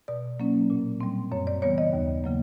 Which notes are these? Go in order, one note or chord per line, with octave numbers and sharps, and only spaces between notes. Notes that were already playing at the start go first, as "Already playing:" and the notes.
B2 D5
F#3 A#3 C#4
A#2
G3 C4
F#2 C#5
D5
C#3 E3 G3 B3 C#5
D#5
D#2
C#3 F#3 A#3